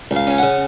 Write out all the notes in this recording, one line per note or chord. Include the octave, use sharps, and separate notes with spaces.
C#2
F5
C#4 G#5
C#3 F#5